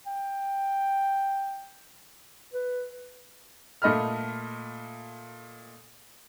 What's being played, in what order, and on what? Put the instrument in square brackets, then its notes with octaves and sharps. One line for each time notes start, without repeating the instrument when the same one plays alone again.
[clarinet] G5
B4
[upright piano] A#2 A3 D#5 B5 F6